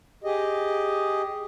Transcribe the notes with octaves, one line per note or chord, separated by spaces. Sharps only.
G4 G#4 D#5